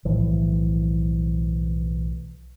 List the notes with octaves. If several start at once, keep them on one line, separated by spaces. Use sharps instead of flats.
B1 A2 E3 F3